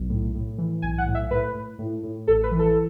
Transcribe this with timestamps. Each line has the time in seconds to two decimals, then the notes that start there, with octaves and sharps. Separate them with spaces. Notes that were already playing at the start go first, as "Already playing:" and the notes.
Already playing: B1
0.09 A2
0.35 A2
0.58 E3
0.82 B1 G#5
0.98 F#5
1.06 A2
1.15 E5
1.30 A2 B4
1.55 A2
1.79 A2
2.03 A2
2.28 A1 A4
2.43 B4
2.51 E3
2.59 A4